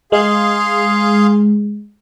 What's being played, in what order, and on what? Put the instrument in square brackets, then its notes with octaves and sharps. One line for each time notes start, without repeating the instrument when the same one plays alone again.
[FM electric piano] G#3 [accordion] G#4 F5 C6